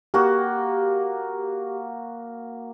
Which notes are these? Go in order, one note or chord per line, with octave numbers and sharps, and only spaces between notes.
A#3 F#4 G4